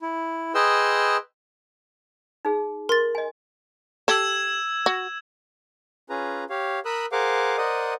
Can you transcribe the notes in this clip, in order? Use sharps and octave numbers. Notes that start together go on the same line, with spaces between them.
E4
G#4 B4 D#5 G5 C6 E6
D#4 G#4
A#4 C6 A6
D#5 G#5
G4 A4 E6 G#6 E7
F#4
C#4 F4 G#4 B4 A#5
G4 C#5 F5
A#4 B5 D#6 E6 F#6
G#4 A#4 C5 F5 F#5 D6
A#4 C5 D5 D#5 F#5 D#6